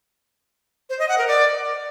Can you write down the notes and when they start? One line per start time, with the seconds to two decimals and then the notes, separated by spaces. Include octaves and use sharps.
0.90 C5
0.99 D#5
1.09 F#5
1.18 A#4
1.28 D5